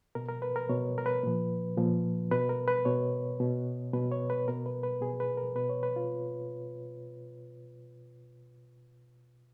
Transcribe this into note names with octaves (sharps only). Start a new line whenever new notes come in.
B2 A#4
A#4
B4
A#4
B2 C#5
A#4
B4
A#2 F3
A#2 F3
B2 B4
A#4
B4
B2 C#5
B2
B2 B4
C#5
B4
B2 A#4
B4
B4
B2 G#4
B4
A#4
B2 B4
C#5
B4
F4